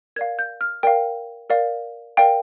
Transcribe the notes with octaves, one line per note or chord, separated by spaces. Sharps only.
A#4 D5 F5 G#6
G6
F6
A#4 D5 F5 G5
A#4 D5 F5
A#4 D5 F5 G5